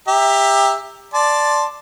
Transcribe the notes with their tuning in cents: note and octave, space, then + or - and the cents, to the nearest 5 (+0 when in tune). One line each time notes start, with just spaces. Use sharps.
G4 +25 E5 +0 A#5 -5
D5 +0 A5 +0 C6 +0